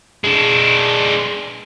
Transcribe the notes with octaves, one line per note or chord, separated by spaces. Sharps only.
G#3 D4